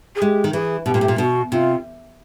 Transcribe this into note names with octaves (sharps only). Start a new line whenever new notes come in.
G#4
G#3 G4
D#3
E3 G#4
B2 G4
A#2
A2
A#2
B2 F#4
C3 F4